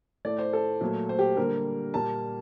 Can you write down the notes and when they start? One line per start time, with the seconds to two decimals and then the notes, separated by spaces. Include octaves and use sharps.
0.25 A2 A3 D5
0.38 C5
0.53 A4
0.81 A#2 F#3 A3
1.09 C5
1.19 G4
1.37 D3 G3 A#3 A#4
1.93 A#2 G3 A#3 A5